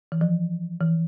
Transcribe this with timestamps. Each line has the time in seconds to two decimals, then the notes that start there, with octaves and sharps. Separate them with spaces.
0.12 E3
0.21 F3
0.80 E3